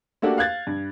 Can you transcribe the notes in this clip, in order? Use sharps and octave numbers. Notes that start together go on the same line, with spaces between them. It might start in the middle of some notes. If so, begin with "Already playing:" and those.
A3 A#3 D4 F#4 G4 A4
F5 F#6 G#6 A6
G2